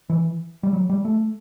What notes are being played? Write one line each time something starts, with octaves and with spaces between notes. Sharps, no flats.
E3
G3
F#3
G3
A3